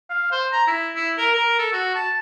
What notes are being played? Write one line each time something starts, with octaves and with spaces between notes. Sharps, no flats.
F5
C5
A#5
E4
E4
A#4
A#4
A4
F#4
A5